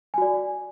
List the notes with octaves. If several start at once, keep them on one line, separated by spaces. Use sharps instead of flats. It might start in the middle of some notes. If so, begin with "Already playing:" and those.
F#4 D5 G#5